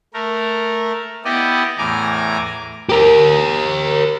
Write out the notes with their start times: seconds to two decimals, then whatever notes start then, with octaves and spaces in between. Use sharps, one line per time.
0.14 A3 A#4
1.25 B3 E4 G4 D5 D#5
1.78 E2 A2 G#5 A#5 D6
2.89 G4 A#4